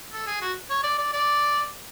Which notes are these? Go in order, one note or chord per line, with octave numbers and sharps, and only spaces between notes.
A4
G#4
F#4
C#5
D5
D5
D5